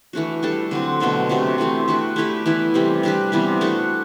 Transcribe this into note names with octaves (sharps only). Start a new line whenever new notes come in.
E3 A3 D4 F#4
G3 D4 A4
D3 F#3 C4
B2 F#3 A3 D4
C3 F#3 A3 D4
C3 E3 A3 C4
A3 D4 F#4 B4
A3 E4 G4 B4
E3 B3 E4 B4
C3 E3 G3
G3 D4 G4 B4
C3 E3 G3 B3
A3 D4 F#4